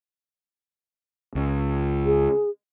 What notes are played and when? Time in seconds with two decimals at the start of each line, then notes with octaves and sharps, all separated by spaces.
1.35 C#2
2.06 G#4